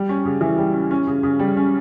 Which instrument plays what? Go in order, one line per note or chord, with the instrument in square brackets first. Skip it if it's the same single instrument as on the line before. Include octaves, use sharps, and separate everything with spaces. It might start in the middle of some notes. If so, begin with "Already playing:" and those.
Already playing: [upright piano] G3 G4
C#4
C#3
E3
G3
C#4
C#4
C#3
C#3
G3
C#4